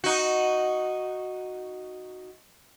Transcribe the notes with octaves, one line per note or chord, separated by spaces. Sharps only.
D#4 F#4